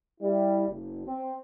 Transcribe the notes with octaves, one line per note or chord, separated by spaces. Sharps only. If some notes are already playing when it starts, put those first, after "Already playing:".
G3 E4
F#1
C4